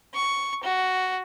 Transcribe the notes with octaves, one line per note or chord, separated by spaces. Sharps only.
C#6
F#4